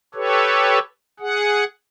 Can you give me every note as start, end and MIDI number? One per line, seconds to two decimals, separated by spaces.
0.14 0.79 67
0.14 0.79 69
0.14 0.79 71
0.14 0.79 73
1.20 1.64 68
1.20 1.64 78